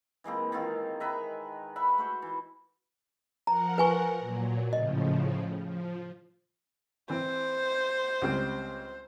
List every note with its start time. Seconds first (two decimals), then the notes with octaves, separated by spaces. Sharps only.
0.24 E3 G#3 A#3 C4
0.52 D#3 G#3 C4 F4
1.00 D#3 B4 E5 A#5
1.76 B4 E5 F#5 B5
1.98 A3 F#4 C5
2.22 E3
3.47 F3 A#4 F#5 A#5
3.78 B4 G#5 C#6
4.19 A#2 F#3
4.73 A2 C#3 F3 D#5
5.65 F3
7.10 E3 C4 C5
8.22 C#2 G3 C4